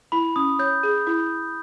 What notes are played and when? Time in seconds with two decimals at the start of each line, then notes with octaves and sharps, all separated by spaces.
0.12 E4 B5
0.36 C#4 D#6
0.59 C#5 G6
0.83 G#4
1.07 E4